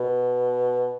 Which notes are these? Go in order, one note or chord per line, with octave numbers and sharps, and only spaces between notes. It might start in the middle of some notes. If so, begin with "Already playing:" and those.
Already playing: B2